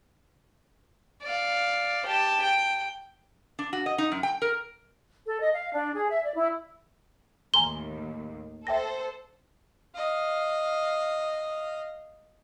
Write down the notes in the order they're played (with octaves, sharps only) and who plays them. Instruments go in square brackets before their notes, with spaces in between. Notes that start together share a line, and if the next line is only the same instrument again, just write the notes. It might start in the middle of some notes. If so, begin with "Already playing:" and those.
[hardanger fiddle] D5 F5
G4 A5
G5
[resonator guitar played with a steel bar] D4
F#4
D#5
D#4
F#2
G5
A#4
[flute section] A4
D#5
F5
D4
G#4
E5
D5
E4
[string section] D#2 A2 [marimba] G#5 A#5 C6 [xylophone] G7
[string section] A4 C5 [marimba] E5 G5 A#6
[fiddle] D#5 F5